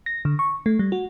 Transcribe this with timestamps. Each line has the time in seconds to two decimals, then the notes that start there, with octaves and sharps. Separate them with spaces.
0.06 A#6
0.25 D3
0.39 C#6
0.66 A3
0.79 G3
0.92 F#4